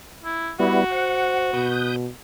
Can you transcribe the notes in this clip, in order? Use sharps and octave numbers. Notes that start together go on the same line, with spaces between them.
E4
G3 B3 E4 F#4
C5 F#5
B2 B4 D#6 G6